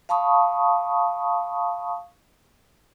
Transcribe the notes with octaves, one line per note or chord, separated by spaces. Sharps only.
F5 A5 B5 C#6 D#6